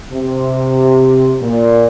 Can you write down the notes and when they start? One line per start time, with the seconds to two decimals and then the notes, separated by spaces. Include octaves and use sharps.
0.12 C3
1.41 A#2